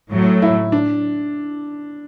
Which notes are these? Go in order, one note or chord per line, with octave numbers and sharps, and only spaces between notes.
A2 F#3 A3
E4
D4